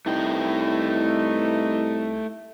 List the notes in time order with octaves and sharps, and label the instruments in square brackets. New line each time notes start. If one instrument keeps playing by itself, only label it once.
[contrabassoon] C2 [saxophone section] E3 D#4 [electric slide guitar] A3 G5